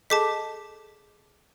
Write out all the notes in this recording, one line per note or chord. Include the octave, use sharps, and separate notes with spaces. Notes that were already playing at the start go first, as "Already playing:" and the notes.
G#4 A4 D#5 A5 D6 B6